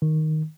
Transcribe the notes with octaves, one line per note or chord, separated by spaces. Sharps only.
D#3